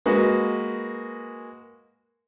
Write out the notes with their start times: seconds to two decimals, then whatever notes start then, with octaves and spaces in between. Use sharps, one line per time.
0.06 G#3 A#3 F#4 B4